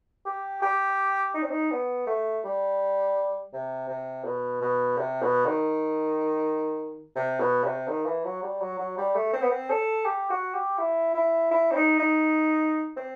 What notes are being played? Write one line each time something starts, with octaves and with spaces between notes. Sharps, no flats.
G4
G4
D#4
C4
D#4
B3
A3
G3
C3
C3
B2
B2
C3
B2
D#3
C3
B2
C3
D#3
E3
F#3
G3
F#3
F#3
G3
A3
C4
B3
C4
A4
G4
F#4
G4
E4
E4
E4
C4
D#4
D#4
C4